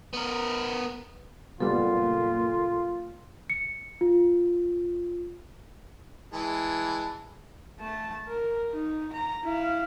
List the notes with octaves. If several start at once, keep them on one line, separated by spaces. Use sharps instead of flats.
B3 A#4
F#1 A#2 G3 B3 F4 A4
C#7
F4
E3 G#3 A5
A3 A5
A#4
D#4
A#5
E4 F5